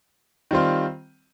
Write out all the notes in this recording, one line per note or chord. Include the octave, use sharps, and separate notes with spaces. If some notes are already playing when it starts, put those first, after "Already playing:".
D#3 G3 C4 F4 C5